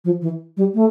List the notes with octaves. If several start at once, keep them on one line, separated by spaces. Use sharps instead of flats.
F3
E3
G3
A3